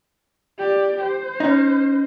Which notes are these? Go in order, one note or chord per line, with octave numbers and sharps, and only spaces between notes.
G4 D5
C5
C#4 D#4